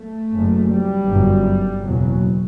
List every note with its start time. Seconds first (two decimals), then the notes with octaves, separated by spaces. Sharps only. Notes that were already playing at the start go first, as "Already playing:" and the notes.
Already playing: A3
0.32 F#1 F#2
0.70 G3
1.09 G1 F#2
1.85 F#1 E2 B2 F#3